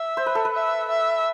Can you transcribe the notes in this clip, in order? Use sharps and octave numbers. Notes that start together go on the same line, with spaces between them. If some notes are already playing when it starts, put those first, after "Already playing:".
Already playing: E5
C5
B4
A4
B4
E5
E5